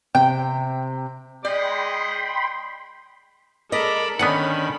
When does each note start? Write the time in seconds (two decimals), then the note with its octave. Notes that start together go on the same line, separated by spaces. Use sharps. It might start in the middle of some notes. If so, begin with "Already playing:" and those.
0.15 C3 G5
1.45 G#3 D5 D#5 G5 B5 C6 D#6
3.72 G#3 A4 A#4 D5 D#5 B5
4.19 D3 D#3 B3 C#4 F#5 G#5 B5